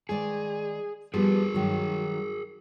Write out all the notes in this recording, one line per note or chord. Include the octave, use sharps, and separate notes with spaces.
D#3 G#3 G#4 D5
F3 G3 B3 G#4 A#4
G2 D#3 F#3